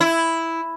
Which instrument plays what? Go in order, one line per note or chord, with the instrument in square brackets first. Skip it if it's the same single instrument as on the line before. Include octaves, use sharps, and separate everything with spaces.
[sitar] E4